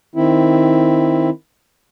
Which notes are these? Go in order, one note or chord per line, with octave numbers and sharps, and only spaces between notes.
D#3 C4 E4